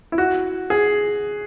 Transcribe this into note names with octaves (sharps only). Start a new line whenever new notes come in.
E4
F#4
G#4